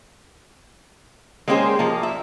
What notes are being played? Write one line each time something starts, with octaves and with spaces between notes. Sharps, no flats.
G#3 A#3 C#4 G4 G#4 C5
F3 A#3
E5